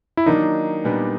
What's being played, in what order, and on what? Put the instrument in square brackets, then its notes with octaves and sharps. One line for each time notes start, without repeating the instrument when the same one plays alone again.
[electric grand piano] E4
[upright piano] D#3 F#3 A#3 D4 [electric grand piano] D#4
[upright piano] A#2 G3 B3 D4